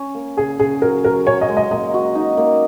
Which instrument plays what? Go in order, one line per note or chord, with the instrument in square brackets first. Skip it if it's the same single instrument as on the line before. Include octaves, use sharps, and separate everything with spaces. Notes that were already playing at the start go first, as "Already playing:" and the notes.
Already playing: [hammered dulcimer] C#4
A#3
[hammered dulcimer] C#3 [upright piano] G#4
[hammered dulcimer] C#3 [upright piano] G#4
[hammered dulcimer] F#3 [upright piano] A#4
[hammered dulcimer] F#3 [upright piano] A#4
[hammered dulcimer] C#4 [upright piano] C#5
[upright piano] D#5
[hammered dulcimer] G#3
[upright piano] D#5
[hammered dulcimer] A#3 [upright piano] D#5
[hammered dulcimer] F#4
D#4
A#3